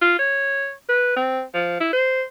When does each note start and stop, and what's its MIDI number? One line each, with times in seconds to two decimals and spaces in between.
0.01 0.17 65
0.19 0.71 73
0.89 1.12 71
1.17 1.42 60
1.54 1.76 53
1.80 1.92 64
1.93 2.23 72